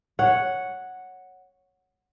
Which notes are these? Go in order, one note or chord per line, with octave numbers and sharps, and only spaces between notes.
C#5 F#5